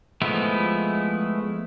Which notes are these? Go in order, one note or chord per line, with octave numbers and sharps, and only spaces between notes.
F3 G#3 A3 B3 E4